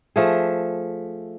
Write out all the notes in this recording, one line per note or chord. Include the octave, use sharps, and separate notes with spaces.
F3 A3 G#4